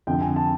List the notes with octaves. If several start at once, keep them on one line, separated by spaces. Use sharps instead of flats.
F2 D3 G5
G#5
A5